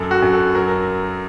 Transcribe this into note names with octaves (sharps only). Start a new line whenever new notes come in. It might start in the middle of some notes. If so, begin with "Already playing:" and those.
Already playing: F#2 A4
F#4
F#2
A4
F#3 A#4